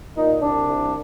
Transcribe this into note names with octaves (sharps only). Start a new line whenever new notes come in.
A#2 D#4
C2 D4
C2